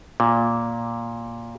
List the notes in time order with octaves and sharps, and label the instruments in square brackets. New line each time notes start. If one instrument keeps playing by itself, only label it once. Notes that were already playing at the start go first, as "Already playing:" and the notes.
[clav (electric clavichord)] A#2